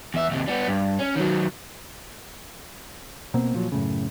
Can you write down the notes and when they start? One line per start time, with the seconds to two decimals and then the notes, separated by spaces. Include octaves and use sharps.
0.14 E2 E5
0.31 D#2 C3
0.48 G3 B3
0.68 G2
1.00 C#4
1.16 D#3 F#3
3.34 B2 A#3 C4
3.54 A#2 F3 F#3
3.72 F#2 A2 C#3